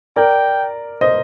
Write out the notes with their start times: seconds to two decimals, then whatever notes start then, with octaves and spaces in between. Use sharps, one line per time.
0.16 A#4 D5 G5
1.01 C5 D#5